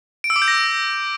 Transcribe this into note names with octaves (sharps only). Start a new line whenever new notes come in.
D7
E6
D6
G6
A#6